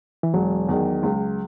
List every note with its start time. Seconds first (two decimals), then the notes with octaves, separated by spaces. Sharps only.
0.23 E3
0.34 E1 F#3
0.68 E2 D#3
1.03 C#2